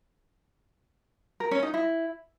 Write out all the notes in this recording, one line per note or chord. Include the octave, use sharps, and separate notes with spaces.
A#4
C#4
D#4
E4